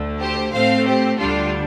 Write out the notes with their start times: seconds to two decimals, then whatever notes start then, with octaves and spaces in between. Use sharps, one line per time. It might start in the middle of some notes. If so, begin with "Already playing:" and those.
Already playing: D2 D3 A3
0.21 G4 C5
0.53 A2 A3 C4 C5 F5
0.86 G4 C5
1.18 D2 D3 G3 D4 F4 A4